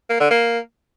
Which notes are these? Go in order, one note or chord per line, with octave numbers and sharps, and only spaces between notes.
A#3
D3
A#3